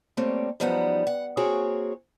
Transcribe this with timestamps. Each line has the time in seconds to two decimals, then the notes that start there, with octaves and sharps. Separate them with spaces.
0.17 G3 A3 A#3 C4 C#5
0.60 F#2 F3 G3 B3 D#4 F#5
1.07 F#5
1.37 A#3 C4 F#4 G#4 C#5